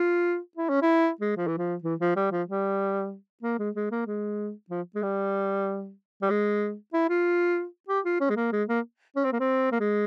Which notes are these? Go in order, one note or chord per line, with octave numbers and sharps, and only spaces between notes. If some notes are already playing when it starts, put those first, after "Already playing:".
Already playing: F4
E4
C#4
E4
G#3
F3
E3
F3
E3
F3
G3
F3
G3
A#3
G#3
G#3
A#3
G#3
F3
G#3
G3
G3
G#3
E4
F4
G4
F4
C#4
G#3
A#3
G#3
A#3
C#4
C4
A#3
C4
A#3
G#3